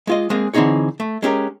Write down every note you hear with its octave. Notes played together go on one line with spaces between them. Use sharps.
G#3 F4 D#5
G#3 A#3 C4 G#4
D3 E3 C4 D#4 G#4 C#5
A3
G#3 C#4 G4 A#4